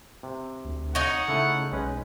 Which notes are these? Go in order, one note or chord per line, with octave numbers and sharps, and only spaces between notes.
C3
D2
D#4 C#5 F#5
C#3 A3 E4 A4
B1 G#3 C#4 B4